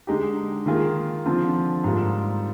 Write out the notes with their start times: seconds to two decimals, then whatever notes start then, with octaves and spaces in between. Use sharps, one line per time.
0.07 D3 G#3 D#4 G4
0.66 D#3 A#3 F4 G#4
1.26 D3 F3 C4 F4
1.84 G#2 G3 A#3 F4